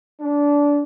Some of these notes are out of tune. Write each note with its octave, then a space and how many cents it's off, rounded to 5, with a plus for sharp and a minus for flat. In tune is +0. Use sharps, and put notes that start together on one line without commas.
D4 -20